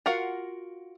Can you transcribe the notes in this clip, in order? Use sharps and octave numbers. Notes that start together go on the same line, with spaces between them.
F4 F#4 A#4 F5 F#5